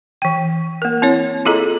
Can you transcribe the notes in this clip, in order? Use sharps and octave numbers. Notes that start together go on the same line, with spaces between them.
E3 G5
A#3 A#4
C4 E4 C#5
E4 F4 G#4 A4 D#5 A#5